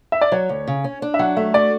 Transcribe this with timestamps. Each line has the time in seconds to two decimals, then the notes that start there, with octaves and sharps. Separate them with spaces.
0.12 E5
0.21 D5
0.32 F#3 C#5
0.49 D2
0.67 C#3
0.84 C#4
1.02 D4
1.14 E5
1.19 F#3 F#5
1.37 A3 E5
1.54 F#4 D5